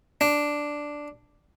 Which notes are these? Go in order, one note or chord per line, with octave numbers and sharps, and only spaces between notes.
D4